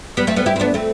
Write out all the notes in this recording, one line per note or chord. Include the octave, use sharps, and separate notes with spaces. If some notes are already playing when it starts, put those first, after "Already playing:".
G3 B3
A3 C4
G3 B3
E4 G4
C4
B3 D4
A3 C4